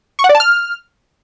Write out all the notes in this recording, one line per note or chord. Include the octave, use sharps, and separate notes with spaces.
C#6
F#5
D5
A5
F6